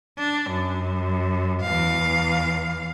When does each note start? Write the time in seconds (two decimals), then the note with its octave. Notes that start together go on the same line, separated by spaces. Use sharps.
0.18 D4
0.50 F#2
1.62 E2 F5